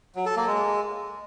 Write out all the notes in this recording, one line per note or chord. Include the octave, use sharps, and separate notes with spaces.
F#3
A4
A#3
G#3